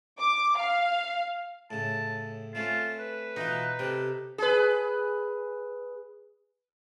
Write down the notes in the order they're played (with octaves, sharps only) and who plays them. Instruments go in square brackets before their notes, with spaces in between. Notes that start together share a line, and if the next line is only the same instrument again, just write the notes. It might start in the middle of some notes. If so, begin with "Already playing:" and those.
[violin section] D6
F5
[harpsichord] A2 C#3 [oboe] A5
[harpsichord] A3 C4 C#4 [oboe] F4
[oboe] B4
[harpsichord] B2 E3 F4 [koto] D#4
[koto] C3 [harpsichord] A4 G5
[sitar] G#4 B4